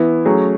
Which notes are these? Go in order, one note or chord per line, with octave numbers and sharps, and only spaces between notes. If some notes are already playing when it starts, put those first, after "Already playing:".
Already playing: E3 B3 E4
F#3 A3 C#4 G#4